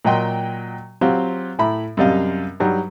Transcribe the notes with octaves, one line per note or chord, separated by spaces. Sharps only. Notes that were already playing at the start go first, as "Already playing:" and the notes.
A#2 F#3 D#5 G5 C6
F#3 C4 F4 G4
A2 E4 A#5 B5
F#2 C3 G3 D#5 F5
G2 F#3 G3 D#4